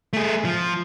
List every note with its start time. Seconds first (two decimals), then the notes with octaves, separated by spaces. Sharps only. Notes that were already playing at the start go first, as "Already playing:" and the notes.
0.13 A3 G#4
0.45 F3